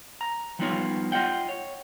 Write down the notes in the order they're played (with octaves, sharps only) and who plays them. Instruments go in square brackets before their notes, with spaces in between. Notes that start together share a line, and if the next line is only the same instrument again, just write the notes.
[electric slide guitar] A#5
F3 G3 B3 D#4 F4 C#5
F4 D#5 F#5 G5
C#5